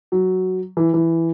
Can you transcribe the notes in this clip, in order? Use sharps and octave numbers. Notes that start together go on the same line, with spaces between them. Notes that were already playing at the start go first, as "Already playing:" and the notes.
F#3
E3
E3